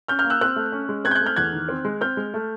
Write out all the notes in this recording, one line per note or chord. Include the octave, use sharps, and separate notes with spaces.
C#4 F6 G6
F6 G6
A#3
E6 F#6
C4 E6 F#6
A3
C#4
G#3
C4 F#6 G#6
G6
F#6 G#6
A3
F6 G6
E2 F#6 G#6
D#3
C4
G#3
C4 F6 G6
G#3
A3